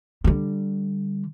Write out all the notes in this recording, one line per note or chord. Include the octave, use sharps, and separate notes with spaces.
D3 G3